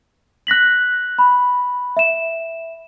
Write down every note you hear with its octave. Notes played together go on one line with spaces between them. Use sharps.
F#6 A#6 B6 F#7
B5
E5 E7